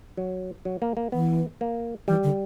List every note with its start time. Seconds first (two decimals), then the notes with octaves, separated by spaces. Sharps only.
0.17 F#3
0.65 F#3
0.82 A#3
0.97 A#3
1.12 E3 B3
1.61 A#3
2.08 E3 G3
2.23 D3